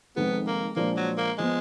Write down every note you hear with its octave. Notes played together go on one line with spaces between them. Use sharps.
F1 F2 D#3 G#3 B3
A#3
A#2 F3 G#3 A#3 D4
F#3
A#3
F3 G#3 B3